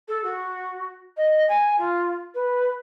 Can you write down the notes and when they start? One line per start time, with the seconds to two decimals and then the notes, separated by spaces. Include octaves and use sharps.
0.08 A4
0.24 F#4
1.17 D#5
1.48 G#5
1.78 F4
2.34 B4